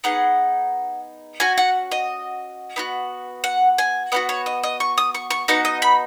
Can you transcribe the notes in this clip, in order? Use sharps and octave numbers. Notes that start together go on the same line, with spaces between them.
B3 D#4 G#4 F#5
C#4 F#4 G#5
F#5
D#5
B3 D#4 F#4
F#5
G#5
B3 D#4 F#4 F#5
C#5
D#5
D#5
C#6
D#6
C#6
C#6
B3 D#4 F#4 F#5
D#5
B5